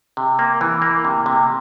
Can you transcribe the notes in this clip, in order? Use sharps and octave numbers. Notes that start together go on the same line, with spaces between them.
C3
A#3
E3
A#3
C3
C3